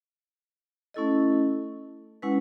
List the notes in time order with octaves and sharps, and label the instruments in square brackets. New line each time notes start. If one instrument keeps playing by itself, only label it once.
[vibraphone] A3 C#4 E4 A4 D#5
G#3 C#4 E4 B4 F#5